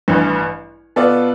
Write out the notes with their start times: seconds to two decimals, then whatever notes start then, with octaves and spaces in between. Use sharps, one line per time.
0.08 A1 G2 E3
0.96 B2 B3 F4 A4 D5